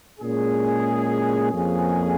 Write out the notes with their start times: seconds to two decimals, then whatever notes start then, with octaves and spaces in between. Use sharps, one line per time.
0.20 A#2 G#3 C#4 G#4
1.51 F2 F3 A#3 C#4 G#4